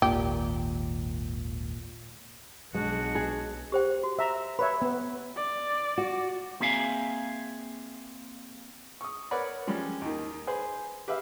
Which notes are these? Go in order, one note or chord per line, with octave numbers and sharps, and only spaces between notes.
G#1 D#2 A#2 G4
B1 B2 G#3 D4 F#4
G#4
G4 C5 G5
F#4
E5 A#5
B4 C#5 E5 B5
B3
D5
F#4
A#3 C4 G#4 E5 F5 G#5
C#6 D#6
A#4 B4 C#5 D5 F#5 B5
F3 G3 G#3 C#4
D#2 D#3
G#4 B4 C5
G4 B4 E5 F5